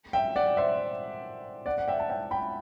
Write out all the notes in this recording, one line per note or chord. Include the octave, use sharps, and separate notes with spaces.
E5 G5
D5 F#5
C5 E5
D5 F#5
F#5
E5 G5
A5
E5 G5
G5 B5